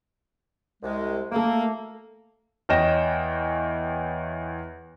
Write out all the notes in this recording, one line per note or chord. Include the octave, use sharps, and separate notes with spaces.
C2 G#3
A3 A#3 A4
E2 C#5 D#5 G5 A#6 E7